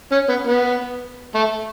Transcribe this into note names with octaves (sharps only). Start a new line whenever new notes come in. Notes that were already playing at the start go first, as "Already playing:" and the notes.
C#4
B3
B3
A3